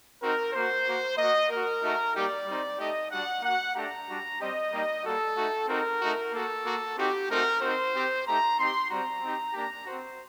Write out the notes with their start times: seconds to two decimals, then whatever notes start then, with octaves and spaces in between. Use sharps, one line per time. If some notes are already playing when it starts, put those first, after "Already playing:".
0.21 C4 D#4 F#4 A#4
0.53 A#3 F#4 C5
0.85 A#3 F#4
1.17 A#3 F#4 D#5
1.49 A#3 F#4 A#4
1.82 A3 D#4 F#4
2.13 G3 A#3 D#4 G4 D5
2.46 G3 C4 D#4
2.79 A3 D#4 G4 D#5
3.10 G3 D4 F#4 F#5
3.42 A#3 F#4 F#5
3.75 A3 D4 G4 A#5
4.08 G3 D4 F#4
4.39 G3 C4 G4 D#5
4.72 G3 A#3 D#4 G4
5.04 G3 A#3 F#4 A4
5.35 A3 D#4 F#4
5.68 C4 D#4 F#4 A#4
6.01 A3 D#4 F#4
6.33 A#3 F#4 A4
6.65 A#3 F#4
6.97 C4 D#4 F#4 G4
7.29 A3 C4 D#4 F#4 A#4
7.61 C4 D#4 F#4 C5
7.93 C4 G4
8.26 A3 D#4 G4 A#5
8.58 C4 D#4 G4 C6
8.90 G3 C4 F#4 A#5
9.22 C4 D#4 G4
9.54 A#3 D4 G4 A#5
9.86 C4 F#4 C5